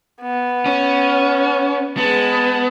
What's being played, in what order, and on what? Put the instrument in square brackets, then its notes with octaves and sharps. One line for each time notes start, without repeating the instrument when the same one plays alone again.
[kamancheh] B3
[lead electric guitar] C#4
[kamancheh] G#3 A5 [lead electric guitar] B3